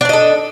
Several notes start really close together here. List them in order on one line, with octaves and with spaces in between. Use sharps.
D4 D5 D#5 A4